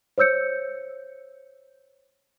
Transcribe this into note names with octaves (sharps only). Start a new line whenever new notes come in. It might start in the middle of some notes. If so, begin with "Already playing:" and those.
C5 C#5 E6 G6 C#7